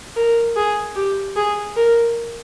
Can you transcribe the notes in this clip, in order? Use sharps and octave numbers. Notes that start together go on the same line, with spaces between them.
A#4
G#4
G4
G#4
A#4